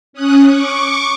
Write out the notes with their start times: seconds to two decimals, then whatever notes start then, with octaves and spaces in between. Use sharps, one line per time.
0.13 C#4 D#6 F#6
0.46 C#6 D6